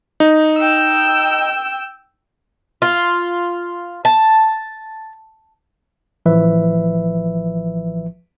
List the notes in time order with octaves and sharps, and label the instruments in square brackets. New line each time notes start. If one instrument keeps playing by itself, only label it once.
[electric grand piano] D#4
[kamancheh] G5 E6
[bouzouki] F4
A5
[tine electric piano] A1 E3 F3 B4 E5